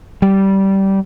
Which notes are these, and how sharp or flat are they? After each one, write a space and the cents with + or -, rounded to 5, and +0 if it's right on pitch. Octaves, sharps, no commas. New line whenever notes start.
G3 -15